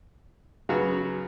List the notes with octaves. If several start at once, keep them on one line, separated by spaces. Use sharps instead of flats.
C#3 F#3 B3 F#4